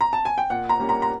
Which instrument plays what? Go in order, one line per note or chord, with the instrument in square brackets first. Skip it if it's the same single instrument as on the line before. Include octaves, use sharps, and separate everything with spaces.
[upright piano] A#5
A5
G#5
G5
A#2 F#5
A#5
G3 A#3 C#4
A#5
A#5